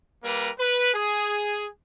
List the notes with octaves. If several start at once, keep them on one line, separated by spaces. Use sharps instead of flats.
G3 A#3 A#4 B4
B4
G#4